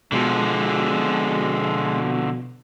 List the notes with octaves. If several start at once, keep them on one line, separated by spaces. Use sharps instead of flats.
B2 D3 F3 G#3